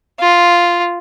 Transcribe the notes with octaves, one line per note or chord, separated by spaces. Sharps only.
F4